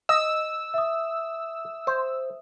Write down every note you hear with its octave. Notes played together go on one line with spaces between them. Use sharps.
D#5 E6
E5 D#6
C5